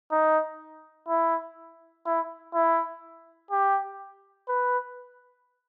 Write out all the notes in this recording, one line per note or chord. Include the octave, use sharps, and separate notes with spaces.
D#4
E4
E4
E4
G4
B4